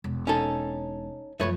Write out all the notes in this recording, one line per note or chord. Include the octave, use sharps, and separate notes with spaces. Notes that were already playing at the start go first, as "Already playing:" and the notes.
E1
C#4 D#4 A4
F#2 F3 A3 B4 C#5